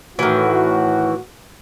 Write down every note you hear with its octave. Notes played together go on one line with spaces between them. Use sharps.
A2 D#3 E3 F#4